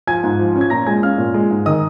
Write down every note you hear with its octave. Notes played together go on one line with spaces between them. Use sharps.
F3 G#5 G#6
G#2
F3
C#4
G#6
A#2 A#5 A#6
G#3 G#5 G#6
C#4 F5 F6
A#2
G#3
G#2
D#3 D#5 D#6